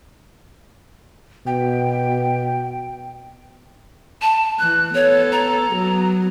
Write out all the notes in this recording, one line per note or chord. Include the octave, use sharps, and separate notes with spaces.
B2 G5
A5
E3 F#6
B3 A4 C#5
A#5
F#3 B3